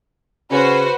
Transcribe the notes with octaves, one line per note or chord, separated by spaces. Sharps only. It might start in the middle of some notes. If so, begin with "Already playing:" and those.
C#3 C#4 F#4 B4 C5